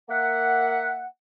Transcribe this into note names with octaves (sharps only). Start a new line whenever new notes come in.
A#3 E5 F#5